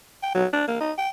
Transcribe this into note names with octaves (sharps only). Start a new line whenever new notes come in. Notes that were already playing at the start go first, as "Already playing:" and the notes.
G5
F#3
D4
A#3
D#4
G5